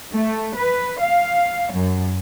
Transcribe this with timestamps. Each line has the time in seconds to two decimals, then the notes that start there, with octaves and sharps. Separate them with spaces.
0.14 A3
0.57 B4
1.01 F5
1.73 F#2